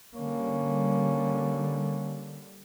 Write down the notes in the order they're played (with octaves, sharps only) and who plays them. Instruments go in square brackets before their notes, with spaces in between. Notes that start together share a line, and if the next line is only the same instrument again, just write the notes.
[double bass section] D3 G3 [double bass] A#3 C#4